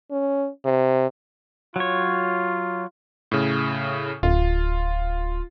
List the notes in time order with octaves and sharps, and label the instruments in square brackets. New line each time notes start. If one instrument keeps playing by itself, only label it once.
[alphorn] C#4
C3
[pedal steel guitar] F#3 C#5 [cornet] F4
[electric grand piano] A2 C#3
[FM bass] D1 [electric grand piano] F4